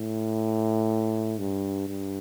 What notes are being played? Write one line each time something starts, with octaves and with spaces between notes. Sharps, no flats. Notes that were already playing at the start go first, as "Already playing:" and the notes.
Already playing: A2
G2
G2